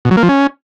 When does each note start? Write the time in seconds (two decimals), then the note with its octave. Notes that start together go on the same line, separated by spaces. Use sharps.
0.05 B2
0.11 F#3
0.17 A#3
0.23 F3
0.29 C#4